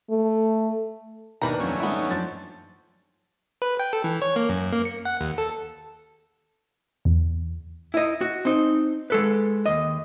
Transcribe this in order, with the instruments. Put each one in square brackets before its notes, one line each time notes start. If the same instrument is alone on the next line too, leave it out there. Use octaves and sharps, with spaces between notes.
[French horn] A3
[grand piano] D#2 D4 [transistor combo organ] B2 [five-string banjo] E3 A#5 [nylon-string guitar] D#4 A#4 B4
[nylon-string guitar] F2 C4 [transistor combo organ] F#3 A3 C#4
[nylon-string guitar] D#3 G#3 [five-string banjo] B3 E4
[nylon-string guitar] D#4
[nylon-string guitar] F#2 F3 D4 [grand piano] A6
[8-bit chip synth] B4
G5
A4
E3
C#5
A#3
F#2
A#3
C#7
F#5
D#2
A4
[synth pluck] E2
[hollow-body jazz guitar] E4 D#5
F#4
C4 D#4
G#3 A4 B4
D#2 D#5